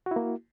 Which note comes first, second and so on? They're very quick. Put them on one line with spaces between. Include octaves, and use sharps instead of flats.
F#4 E4 A#3